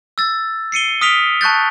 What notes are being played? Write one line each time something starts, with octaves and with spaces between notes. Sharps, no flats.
E6 A6
C7 C#7 D#7 G7
D#6 F6 B6 D7 F7 G7
A5 C#6 F#6 G6 A6